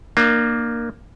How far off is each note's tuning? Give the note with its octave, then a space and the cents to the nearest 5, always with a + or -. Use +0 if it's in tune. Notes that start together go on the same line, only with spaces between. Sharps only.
A#3 +0 D4 +40